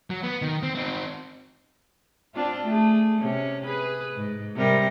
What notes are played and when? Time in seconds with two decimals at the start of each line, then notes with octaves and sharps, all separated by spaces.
0.10 F#3
0.23 B3
0.42 D#3
0.63 C4
0.75 C4 D#4
2.35 C4 D4 F4
2.64 A3 G#4
3.21 C3 C#4
3.66 G#4 B4
4.16 G#2
4.56 C3 G3 A#4